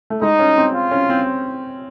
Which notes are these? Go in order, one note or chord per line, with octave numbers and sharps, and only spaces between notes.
A3
G#3 D#4
C#4
C4
F4
C#4
C4